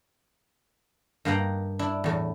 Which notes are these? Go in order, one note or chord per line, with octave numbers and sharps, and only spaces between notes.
G2 A#3 D#5 F#5 G5 A#5
D4 E4
E2 A2